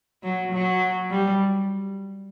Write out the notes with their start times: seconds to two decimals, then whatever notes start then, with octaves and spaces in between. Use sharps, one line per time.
0.23 F#3
0.52 F#3
1.10 G3